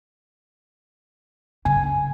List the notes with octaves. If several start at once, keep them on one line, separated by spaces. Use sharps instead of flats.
F#2 C#3 G#5